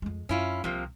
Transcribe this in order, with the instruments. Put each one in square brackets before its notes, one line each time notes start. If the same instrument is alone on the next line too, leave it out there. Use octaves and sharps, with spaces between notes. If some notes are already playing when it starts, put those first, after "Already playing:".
[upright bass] F2 G#3
[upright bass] F#2 [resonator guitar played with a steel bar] C#4 E4 F4
[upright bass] C2 [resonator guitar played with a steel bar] C3 F3 A#3